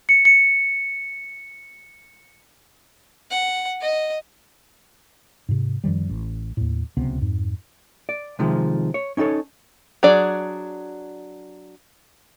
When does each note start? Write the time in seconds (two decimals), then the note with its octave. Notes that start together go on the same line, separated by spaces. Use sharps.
0.09 C#7
0.25 C#7
3.31 F#5
3.81 D#5
5.49 G#2 C3
5.84 F#2 D#3 F3 G3
6.09 A1
6.57 D#2 A2
6.97 D1 C#2 C3 B3
7.21 F2 G#2
8.09 D5
8.39 C3 D#3 F3 G#3
8.94 C#5
9.17 C#4 D#4 F#4 A4 C#5
10.03 F#3 D4 G#4 D5